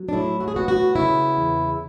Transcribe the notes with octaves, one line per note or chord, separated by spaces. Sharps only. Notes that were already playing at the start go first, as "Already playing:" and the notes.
Already playing: F#3
D4
A2 E4
F#4
G#4
B3 F#4
F#4
C#3 E4
E2